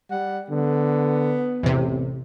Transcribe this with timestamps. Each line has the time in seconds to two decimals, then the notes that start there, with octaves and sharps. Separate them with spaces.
0.11 G3 F#5
0.50 D3 B3
1.63 A1 E2 C3